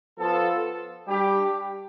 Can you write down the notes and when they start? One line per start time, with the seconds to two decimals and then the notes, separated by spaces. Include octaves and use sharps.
0.18 F3 B3 F4 A4
1.07 G3 D4 G4